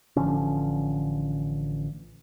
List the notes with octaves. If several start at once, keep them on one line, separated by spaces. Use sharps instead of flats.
A1 D3 F3 C#4